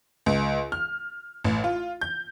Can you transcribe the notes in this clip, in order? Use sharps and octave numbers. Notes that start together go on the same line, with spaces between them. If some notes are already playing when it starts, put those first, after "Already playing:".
C#2
F6
A1
F4
G6